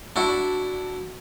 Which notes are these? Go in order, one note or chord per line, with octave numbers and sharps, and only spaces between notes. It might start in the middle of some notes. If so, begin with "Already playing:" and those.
D4 E4 F#4